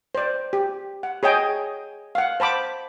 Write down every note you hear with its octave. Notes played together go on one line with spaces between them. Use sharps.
C5 D5
G4
F#5
G#4 C#5 D#5 G5 G#5
F5 F#5
C5 A5 B5 D6